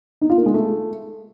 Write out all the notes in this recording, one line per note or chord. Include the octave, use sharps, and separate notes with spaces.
D#4
F4
A#3
G#3
A3